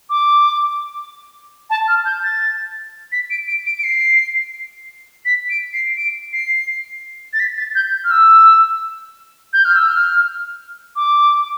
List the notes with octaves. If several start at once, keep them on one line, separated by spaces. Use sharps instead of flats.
D6
A5
F6
G6
A6
B6
D7
D7
D7
D7
C7
B6
D7
C7
D7
C7
A6
B6
A6
G6
F6
E6
G6
F6
E6
F6
D6